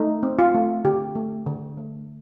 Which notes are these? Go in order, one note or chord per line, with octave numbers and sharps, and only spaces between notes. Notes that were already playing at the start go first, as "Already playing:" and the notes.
Already playing: A3 D#4
C4
F4
A3
D3 G4
A3
D3
A3